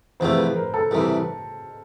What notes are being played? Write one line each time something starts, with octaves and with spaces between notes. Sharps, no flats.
E2 C3 F3 A3 C5
B4
A#4
A4
C2 C3 E3 A#4